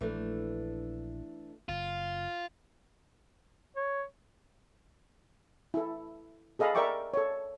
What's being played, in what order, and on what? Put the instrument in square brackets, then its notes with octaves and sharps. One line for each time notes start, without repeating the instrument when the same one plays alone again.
[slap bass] A#1 [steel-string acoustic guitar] E3 A3 D4
[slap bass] F#1 [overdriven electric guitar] F4
[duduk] C#5
[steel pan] E4 A4
G#4 A4 D#5 F5 B5
A#4 D5 E5 G5 C#6 D6
A4 C#5